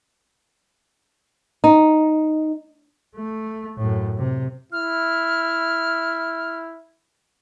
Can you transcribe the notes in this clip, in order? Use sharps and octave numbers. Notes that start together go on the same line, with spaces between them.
D#4
A3
F#2 A2
C3
E4 F6